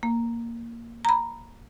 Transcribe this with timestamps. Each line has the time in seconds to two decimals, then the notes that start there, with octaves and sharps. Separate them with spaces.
0.03 A#3
1.05 A#5 B5